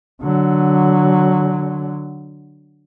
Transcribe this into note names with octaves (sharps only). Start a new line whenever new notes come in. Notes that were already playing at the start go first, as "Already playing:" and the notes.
D3 F#3